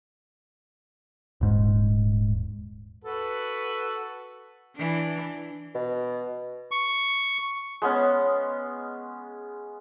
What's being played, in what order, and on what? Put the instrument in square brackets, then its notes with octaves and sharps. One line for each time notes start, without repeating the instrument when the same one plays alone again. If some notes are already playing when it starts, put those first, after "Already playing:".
[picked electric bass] D#1 G#2
[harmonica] F#4 A4 B4
[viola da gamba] E3 D4
[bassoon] B2
[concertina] C#6
[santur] G#3 B3 C#4